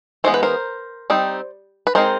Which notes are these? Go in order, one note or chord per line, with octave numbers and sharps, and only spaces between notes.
E3 G#3 B3 C5
B4
A#4 C5
G3 C4 D#4
B4
G#3 C4 D#4 A#4 C5